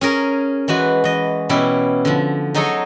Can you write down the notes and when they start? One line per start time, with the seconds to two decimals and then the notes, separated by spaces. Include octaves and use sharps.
0.01 C#4 G#4 A#4
0.68 E3 G#3 F#4 B4
1.04 E3 D#5
1.49 B2 E3 G3 C#4 E4
2.05 D3 F3
2.55 F#3 D#4 G#4 A4 C#5 D#5